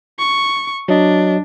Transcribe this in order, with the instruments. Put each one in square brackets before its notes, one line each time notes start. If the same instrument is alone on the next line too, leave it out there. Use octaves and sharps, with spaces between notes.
[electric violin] C#6
[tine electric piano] F#3 D#5 [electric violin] D4